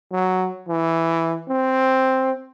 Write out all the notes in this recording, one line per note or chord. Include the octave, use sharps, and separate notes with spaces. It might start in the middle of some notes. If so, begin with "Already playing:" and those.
F#3
E3
C4